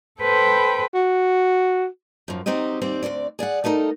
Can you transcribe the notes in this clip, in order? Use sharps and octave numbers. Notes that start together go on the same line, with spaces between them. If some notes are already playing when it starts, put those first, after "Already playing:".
A4 B4 C5 G5 B5
F#4
F#2 F3
F#3 C4 D#4 G4 D#5
D#2 G3 C4 D5
D2 C3 C4 D5
G#4 D5 F5 F#5
A3 D#4 A4 A#4